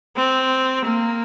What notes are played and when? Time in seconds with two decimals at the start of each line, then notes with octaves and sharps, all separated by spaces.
0.16 C4
0.84 A#3